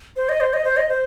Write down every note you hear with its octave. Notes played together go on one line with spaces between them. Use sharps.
C5
D#5
C5
D#5
C5
D#5
C5